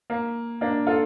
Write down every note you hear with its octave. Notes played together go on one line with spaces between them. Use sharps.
A#3
A#3 D4
F4 A4